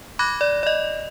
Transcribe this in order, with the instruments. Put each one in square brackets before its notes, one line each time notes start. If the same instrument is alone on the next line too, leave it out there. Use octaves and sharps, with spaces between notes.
[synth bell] B5 D6 F#6 G#6 A#6
D5
D5 D#5